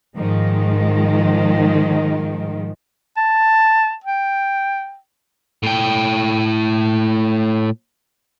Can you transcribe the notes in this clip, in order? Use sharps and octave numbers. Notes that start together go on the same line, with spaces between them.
G#2 D#3 F3 G#3
A5
G5
A2 G5